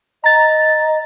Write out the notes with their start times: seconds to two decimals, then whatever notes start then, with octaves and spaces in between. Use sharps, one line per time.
0.24 D#5 A#5 A6